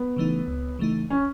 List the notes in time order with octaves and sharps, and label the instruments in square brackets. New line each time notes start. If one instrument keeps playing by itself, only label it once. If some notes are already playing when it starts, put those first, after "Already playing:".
Already playing: [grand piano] B3
[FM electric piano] C#3 E3 A3 D#4
C#2
C#3 E3 A3 D#4
[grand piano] C#4